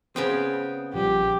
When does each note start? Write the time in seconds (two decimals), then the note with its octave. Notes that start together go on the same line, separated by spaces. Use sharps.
0.16 C#3 B3 C4 G#4 G5 D#6
0.94 A#1 F3 G3 G4